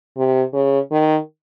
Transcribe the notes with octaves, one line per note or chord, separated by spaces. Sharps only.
C3
C#3
D#3